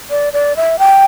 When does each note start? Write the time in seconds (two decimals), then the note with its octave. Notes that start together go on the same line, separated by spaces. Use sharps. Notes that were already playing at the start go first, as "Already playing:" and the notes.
0.10 D5
0.33 D5
0.56 E5
0.79 G5